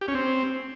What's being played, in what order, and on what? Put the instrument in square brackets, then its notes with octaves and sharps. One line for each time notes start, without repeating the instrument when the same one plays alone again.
[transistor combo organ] G4
C#4
C4